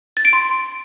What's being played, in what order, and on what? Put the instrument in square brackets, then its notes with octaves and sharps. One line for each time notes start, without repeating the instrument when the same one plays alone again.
[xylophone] A6
D7
C6